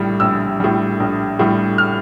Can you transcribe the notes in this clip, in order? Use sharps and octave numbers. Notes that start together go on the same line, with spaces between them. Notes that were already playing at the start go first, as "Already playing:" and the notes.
Already playing: A#1 A2 G3
A#1 E6
A2 G3
A#1
A2 G3
F6